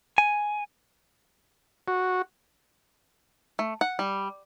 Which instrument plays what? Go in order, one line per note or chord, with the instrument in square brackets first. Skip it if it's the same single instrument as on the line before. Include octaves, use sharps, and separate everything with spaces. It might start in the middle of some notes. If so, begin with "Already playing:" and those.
[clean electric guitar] G#5
[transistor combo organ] F#4
[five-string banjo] A3
F#5
G3